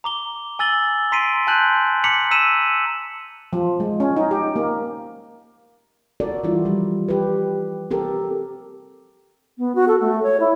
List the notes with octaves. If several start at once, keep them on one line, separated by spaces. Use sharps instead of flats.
A#5 D6 G7
G#5 E6 A6 F#7 G7
A#5 C6 B6 C7 D7 D#7
G#5 A5 C6 F#6 G6 F#7
A#5 D6 B6 C#7 F7 F#7
A#5 E6 B6 D#7 E7
F3
G#3
C#4
D#4
G4
A#3
F#4 A4 A#4 D5
E3 G3 D4 E4 F4
F3 G3
G4 B4
C4 G4 A4 A#4
B3
F#4
A4
A3
C#5
E4